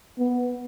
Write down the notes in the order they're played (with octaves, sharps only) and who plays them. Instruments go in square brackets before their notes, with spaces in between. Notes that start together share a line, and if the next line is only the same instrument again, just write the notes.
[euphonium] B3